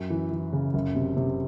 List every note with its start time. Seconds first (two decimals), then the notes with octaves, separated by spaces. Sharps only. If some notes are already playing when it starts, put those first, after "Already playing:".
Already playing: F#2
0.10 E3
0.31 E3
0.53 C#3
0.74 F#1
0.95 C3
1.17 C3